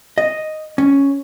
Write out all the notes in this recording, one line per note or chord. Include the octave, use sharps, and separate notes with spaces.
D#5
C#4